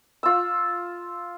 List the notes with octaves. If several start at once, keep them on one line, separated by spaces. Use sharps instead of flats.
F4 E6